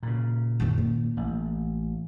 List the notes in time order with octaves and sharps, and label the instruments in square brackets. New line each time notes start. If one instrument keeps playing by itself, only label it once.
[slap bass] A#2 C#3
[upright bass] F#2 D#3
A#3
[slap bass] A1